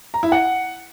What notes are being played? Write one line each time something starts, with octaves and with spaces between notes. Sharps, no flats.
A#5
E4
F#5